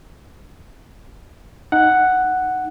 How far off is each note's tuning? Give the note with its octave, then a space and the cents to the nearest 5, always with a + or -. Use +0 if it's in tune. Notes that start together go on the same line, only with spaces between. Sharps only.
D#4 +0 F#5 +0